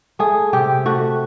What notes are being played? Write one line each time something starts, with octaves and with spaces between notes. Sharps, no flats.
A3 G#4
C3 G4
A3 F#4